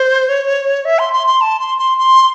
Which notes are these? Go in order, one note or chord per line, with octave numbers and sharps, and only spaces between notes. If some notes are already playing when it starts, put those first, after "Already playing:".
Already playing: C5
C#5
E5
C6
C6
C6
A5
C6
C6
C6